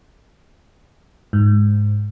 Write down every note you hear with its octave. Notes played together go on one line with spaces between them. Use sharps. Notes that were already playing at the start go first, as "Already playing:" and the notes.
G#2